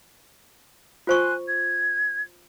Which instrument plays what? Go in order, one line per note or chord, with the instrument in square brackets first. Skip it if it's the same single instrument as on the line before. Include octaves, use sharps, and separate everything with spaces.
[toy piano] F4 C5 C#6 [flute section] G#5 C6 F#6
[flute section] G#6